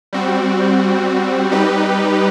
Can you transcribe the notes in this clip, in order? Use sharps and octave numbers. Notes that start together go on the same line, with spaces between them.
G3 C4 F#4
G3 D#4 G4 B4